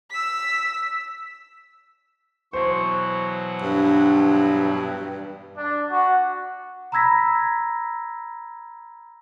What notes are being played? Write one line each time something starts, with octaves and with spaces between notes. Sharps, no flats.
E6 B6
B2 E3 F#3 C5 C#6
G2 D4
D4
F#4
A#5 B5 E6 G#6 A#6 B6